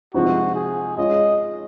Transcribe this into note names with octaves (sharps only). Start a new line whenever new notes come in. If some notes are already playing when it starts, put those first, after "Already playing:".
C3 F3 G#3 C4 D#4 F#4
G#4
G#3 C#4 F4 D#5